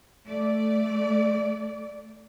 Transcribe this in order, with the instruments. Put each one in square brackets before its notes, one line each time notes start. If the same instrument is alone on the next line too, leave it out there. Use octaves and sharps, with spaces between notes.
[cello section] A3 D5